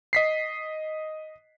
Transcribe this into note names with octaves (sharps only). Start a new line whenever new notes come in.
D#5 B6 C7